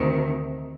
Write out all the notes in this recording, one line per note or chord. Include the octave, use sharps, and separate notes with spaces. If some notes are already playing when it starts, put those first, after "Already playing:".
Already playing: D2 C3 D#3